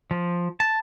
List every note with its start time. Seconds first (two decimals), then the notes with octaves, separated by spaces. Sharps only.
0.11 F3
0.60 A5